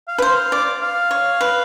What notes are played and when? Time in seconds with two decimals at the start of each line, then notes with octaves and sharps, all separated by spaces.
0.08 F5
0.18 B4
0.22 C5
0.52 D5
0.81 F5
1.11 C#5
1.41 B4